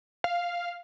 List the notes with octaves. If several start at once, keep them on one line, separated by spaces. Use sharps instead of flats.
F5